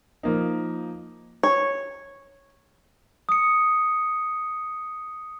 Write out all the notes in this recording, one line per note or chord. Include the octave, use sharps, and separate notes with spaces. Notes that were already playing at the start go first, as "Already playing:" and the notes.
F3 A#3 D#4
C#5
D#6 C#7